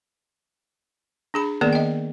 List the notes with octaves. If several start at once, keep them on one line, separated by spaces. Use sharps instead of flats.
D4 G#4 B5
D#3 A#3 B3 G#4 D5
D#5 G5